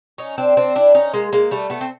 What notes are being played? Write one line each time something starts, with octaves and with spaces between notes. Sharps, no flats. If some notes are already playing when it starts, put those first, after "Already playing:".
C#4 D#4
C4 D4
C4 D4
D4 E4
C#4 D#4
G#3 A#3
G#3 A#3
G3 A3
A3 B3
C4